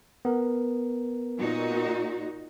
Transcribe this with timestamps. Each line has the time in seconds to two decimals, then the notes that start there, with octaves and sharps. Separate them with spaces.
0.25 B3 A#4
1.39 A#2 D#4 F#4